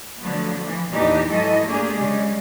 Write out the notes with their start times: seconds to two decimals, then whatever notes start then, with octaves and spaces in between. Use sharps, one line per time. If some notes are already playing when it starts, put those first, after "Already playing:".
0.20 D3 F3 F#3 A3 B3
0.62 E3 F3
0.92 E2 A#2 E3 D4 D#4 G4
1.29 G#2 E3 F#3 E4 A4 D#5
1.64 A3 A#3 D4 G4 G#4
1.97 C#3 G3 G#3